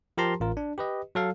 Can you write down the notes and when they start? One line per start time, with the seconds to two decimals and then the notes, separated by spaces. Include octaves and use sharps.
0.18 F3 G4 A#4 A5 A#5 C6
0.40 A1 F4 A#4
0.57 D4
0.78 G4 B4 D#5
1.15 F#3 A4 F5